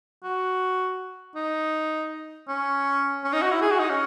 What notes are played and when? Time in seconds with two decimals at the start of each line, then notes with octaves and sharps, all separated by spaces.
0.23 F#4
1.36 D#4
2.48 C#4
3.24 C#4
3.33 D#4
3.42 F#4
3.51 E4
3.61 G#4
3.71 F#4
3.79 D#4
3.90 C#4